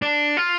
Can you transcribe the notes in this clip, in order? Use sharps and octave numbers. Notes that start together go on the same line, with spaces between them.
D4
F4